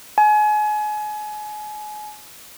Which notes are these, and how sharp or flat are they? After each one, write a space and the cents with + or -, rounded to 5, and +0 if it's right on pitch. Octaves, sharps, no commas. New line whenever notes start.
G#5 +30